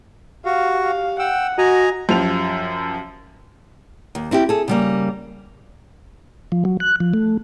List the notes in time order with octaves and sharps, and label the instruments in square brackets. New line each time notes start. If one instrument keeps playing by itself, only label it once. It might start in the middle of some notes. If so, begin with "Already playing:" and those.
[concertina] F#4 [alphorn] G4 [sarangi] F5
[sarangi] F5
[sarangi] F#5 [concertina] G5 E6
[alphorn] F#4 [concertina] D#5 G#5 A#5
[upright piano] F#2 F3 G4 F7
[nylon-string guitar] D#2
C4 E4 F#4 G4
G#4 A4
C#3 G3 A#3
[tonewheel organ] F3
F#3
F#6
F3
A3